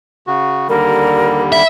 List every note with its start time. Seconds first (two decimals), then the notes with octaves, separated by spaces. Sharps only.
0.27 C#3 F#4
0.69 D#2 D3 G3 A#4
1.52 E5 B5